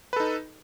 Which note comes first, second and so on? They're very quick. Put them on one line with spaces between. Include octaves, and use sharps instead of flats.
B4 A4 D#4